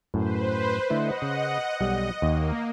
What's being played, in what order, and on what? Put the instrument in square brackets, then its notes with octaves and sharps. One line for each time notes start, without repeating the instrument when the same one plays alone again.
[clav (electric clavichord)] F#2 A2 [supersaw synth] B4 C5
[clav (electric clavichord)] D3 A3 E4 [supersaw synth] D#5 F#5
[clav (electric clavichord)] C#3
[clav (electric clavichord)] B1 G3 [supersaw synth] D#5
[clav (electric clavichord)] D#2 [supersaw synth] A#3